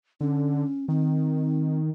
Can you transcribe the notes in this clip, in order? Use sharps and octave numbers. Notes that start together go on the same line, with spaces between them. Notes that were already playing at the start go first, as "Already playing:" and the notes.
D3 C#4
D#3 C4